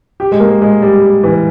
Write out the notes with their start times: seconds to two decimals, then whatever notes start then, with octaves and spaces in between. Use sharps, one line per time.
0.20 G4
0.32 G#3
0.40 A#3
0.62 G#3
0.82 G3
1.23 E3